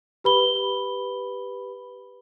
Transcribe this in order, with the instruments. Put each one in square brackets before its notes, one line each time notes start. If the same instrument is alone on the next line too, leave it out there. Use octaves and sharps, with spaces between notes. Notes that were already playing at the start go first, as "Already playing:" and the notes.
[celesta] G4 B4 B5 G7